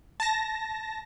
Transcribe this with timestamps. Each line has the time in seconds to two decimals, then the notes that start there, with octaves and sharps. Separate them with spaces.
0.20 A5 A#6